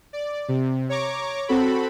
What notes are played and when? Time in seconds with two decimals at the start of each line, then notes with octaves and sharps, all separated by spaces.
0.13 D5
0.49 C3
0.89 C#5 A#5 C#6 D6
1.48 C4 F#4 A4 B5